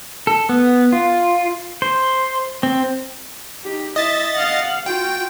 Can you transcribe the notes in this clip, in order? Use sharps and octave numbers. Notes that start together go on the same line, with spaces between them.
A4
B3
F4
C5
C4
D#4 G4
E4 D#5 E5 A6
F5 F#5
F4 F#4 G5